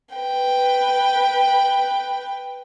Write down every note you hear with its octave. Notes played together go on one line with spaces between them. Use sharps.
B4 G5